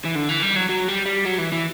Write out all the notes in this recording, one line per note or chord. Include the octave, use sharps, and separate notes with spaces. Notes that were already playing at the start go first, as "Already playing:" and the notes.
E3
D3
E3
G3
F#3
F#3
G3
G3
F#3
E3
E3